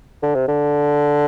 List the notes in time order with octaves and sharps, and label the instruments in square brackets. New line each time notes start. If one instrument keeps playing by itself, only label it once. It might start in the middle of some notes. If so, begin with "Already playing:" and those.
[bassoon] D3
C3
D3